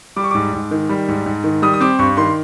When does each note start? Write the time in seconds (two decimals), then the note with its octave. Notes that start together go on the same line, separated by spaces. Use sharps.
0.16 G3 D6
0.24 C#6
0.31 G#2 D6
0.53 G#2
0.71 D#3
0.89 G3
1.08 G#2
1.26 G#2
1.44 D#3
1.62 G3 D#6
1.74 D#6
1.80 C4 D6
1.99 G2 C#6
2.17 D#3 C6